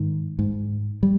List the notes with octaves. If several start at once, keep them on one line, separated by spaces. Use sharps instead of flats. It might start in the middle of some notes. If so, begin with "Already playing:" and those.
Already playing: G#2 D#3
G#2
G3